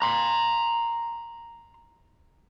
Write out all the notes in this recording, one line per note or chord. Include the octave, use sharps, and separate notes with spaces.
A#5 C6